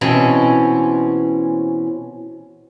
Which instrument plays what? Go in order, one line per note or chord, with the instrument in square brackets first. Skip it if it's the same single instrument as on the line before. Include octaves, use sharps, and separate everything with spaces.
[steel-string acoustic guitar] B2 E3 C4 C#4